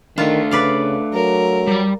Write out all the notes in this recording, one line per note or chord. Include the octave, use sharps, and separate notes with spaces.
D#3 A3 D4 F4
C#3 B4 D5 F5
F#3 A#4
G3 D5